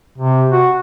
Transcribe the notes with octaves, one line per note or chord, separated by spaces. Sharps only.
C3
F#4